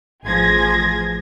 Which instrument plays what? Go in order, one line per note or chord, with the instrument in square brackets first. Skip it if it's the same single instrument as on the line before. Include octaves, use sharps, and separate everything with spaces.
[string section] A1 F3 G#4 G#6 A#6